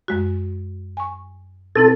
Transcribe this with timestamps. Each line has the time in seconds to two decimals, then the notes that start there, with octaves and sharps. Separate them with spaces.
0.08 F#2 G#3 F#4
0.97 G#5 C#6
1.76 B2 C4 E4 A4